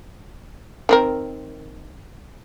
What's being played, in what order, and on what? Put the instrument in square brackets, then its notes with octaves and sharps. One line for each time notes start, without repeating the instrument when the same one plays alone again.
[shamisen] D#3 C4 A#4